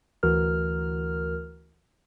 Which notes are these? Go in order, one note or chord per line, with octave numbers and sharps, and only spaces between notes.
D2 E3 F#4 A#4 F6